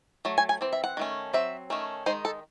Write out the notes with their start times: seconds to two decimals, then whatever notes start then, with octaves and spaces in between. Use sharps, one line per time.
0.25 F#3 A3
0.38 G#5
0.49 G#5
0.61 E3 C4
0.73 E5
0.84 F#5
0.97 D#3 A3 C#4
1.33 F#3 C4 E5
1.70 D#3 A3 C#4
2.06 D#3 G#3 D#4 C5
2.25 A4